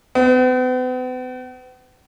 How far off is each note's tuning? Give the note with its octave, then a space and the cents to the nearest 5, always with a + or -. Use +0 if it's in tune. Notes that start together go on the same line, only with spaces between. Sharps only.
B3 +45